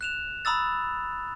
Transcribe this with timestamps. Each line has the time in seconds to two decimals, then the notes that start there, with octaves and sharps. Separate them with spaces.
0.01 F#6 E7 F7
0.45 A#5 B5 D#6 E6 A6